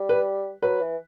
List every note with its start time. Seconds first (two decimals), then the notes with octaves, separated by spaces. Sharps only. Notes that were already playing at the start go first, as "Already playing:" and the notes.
Already playing: G3
0.09 B4
0.63 F#3 B4
0.81 E3